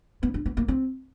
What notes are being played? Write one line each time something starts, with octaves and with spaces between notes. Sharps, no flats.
B3
D4
B3
A#3
C4